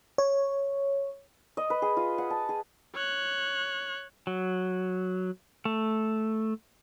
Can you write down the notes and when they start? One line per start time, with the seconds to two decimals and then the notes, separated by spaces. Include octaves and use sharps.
0.18 C#5
1.57 D#5
1.70 B4
1.82 G#4
1.97 F4
2.18 F#5
2.30 A5
2.49 G#4
2.95 C#5 F#6
4.27 F#3
5.65 A3